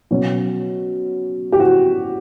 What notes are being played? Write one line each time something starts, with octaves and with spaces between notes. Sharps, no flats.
B2 F#3 C#4
G4
F#4